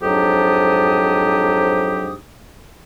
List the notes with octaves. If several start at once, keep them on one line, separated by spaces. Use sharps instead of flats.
F2 G#2 F#3 D4 G4 D#6